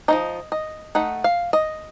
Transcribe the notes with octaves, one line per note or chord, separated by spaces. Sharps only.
F3 C4 D#4 D#5
D#5
A3 D#4 F#5
F5
D#5